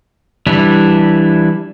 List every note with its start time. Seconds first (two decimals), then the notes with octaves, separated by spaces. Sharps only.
0.47 E3 G3 D4 E4